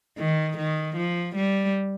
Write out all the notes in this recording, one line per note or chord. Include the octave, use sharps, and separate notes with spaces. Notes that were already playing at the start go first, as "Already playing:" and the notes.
D#3
D#3
F3
G3